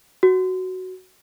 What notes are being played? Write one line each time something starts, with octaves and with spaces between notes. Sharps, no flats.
F#4